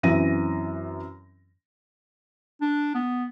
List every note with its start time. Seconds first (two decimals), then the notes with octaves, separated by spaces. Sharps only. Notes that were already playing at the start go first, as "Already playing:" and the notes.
0.03 F#2 E3 C4 A#6 D#7
2.61 D4
2.95 B3